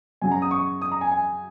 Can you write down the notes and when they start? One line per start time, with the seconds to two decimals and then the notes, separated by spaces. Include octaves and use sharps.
0.22 F#2 C#3 F#3 G#5
0.32 A#5
0.42 D#6
0.51 C#6
0.82 D#6
0.92 A#5
1.01 G#5
1.12 G#5